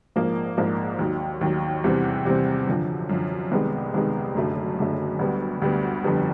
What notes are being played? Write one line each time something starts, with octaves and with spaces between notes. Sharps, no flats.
A#1 G#2 F3 A#3
A#1 G#2 F3 A#3
D#2 D#3 F#3
D#2 D#3 F#3
E2 C3 E3 G3 C4
E2 C3 E3 G3 C4
F#2 D3 F3
F#2 D3 F3
C2 C3 D#3 G#3 B3
C2 C3 D#3 G#3 B3
F#1 F#2 D3 F#3 A3
F#1 F#2 D3 F#3 A3
D2 D3 G3 B3
D2 D3 G3 B3
G1 F2 D3 G3 B3